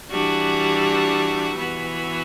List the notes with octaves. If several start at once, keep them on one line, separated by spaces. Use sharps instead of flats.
E3 G3 D4 F#4
E3 B3 F#4